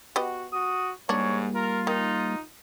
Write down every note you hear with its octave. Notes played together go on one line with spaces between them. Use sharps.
B3 F#4 G4 D#5
F#4 D#6
G#2 G3 G#3 A#3 D4 C#5
F4 A#4
D#3 D#4